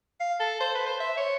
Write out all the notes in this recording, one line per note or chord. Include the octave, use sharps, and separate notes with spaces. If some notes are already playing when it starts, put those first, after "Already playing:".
F5
A4
C5
B4
C5
E5
C#5